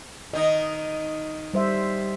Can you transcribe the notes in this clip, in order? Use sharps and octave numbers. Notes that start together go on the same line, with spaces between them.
D#3 D#4 D#5
G3 C5 E5